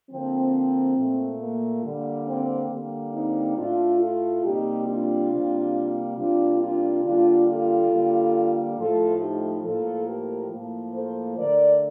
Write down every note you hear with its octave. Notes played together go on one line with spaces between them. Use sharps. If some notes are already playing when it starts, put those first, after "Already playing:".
D3 F3 A#3 C4
A#2 A3
A#3
D3 G3 A#3
C4
D3 G3 A#3
C4 D#4
A2 A3 D4 F4
F4 A4
C3 G3 A#3 D#4 G4
D4 F4
C3 G3 A#3
C3 G3 A#3 D4 F4
D4 F4
D3 G3 A#3 D4 F4
F4 A4
D3 G3 A#3
A2 F3 A3 F4 A4
D#4 G4
A2 F3 A#3 F4 A4
G4 A#4
A2 F3 A#3
A4 C5
D3 A3 A#4 D5